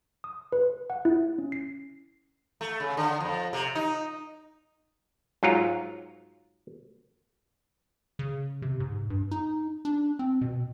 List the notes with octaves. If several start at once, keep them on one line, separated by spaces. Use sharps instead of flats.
D#6
B4
F#5
E4
C#4
C7
A3
C#3
D3
F2
C3
D#4
G#2 F#3 F4 A#5
C#3
C3
G#2
G2
D#4
D4
C4
B2